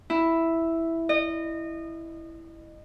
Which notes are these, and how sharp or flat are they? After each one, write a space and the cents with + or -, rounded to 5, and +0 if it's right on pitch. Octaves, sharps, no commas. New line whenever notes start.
E4 +0
D#5 -25